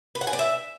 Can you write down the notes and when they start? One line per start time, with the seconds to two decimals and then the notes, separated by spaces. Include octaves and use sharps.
0.15 B4
0.21 F#5
0.27 G#5
0.33 D5
0.39 E5